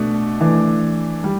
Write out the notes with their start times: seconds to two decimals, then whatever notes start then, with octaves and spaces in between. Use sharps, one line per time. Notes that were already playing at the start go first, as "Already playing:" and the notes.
Already playing: B2 A3 D4
0.41 E3 A3 D4
1.24 G3